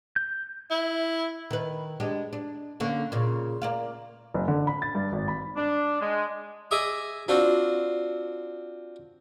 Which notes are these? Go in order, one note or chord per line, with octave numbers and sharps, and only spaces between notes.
G6
E4
D#3 B4
G#3 D4 G4
D4
D3 A#3 C#4
A#2 C#3
A#3 D5 F5
F#1
D3
B5
A6
G2
G#1
B5
D4
G#3
G#4 D#5 E5 D6 D#6
C4 D4 F4 F#4